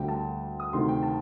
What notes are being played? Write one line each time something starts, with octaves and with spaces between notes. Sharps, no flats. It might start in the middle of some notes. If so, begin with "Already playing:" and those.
Already playing: D2 D3 G3 G5
A5
D#6
D2 C3 D#3 A3 C4 C6
G5
A5